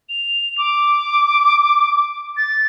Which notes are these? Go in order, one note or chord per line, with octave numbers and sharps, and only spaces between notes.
F7
D6
A6